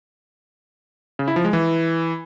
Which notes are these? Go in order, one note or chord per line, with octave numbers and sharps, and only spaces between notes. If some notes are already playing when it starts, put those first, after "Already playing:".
C#3
E4
F3
G#3
E3